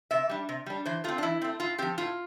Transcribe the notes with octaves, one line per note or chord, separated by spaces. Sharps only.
C3 E5
G3 D4
C3
G3 D4
E3 C5
A3 C4 F4
D4
E3 E4
A3 C4
A2 F4
F3 C4 G4
A2 F4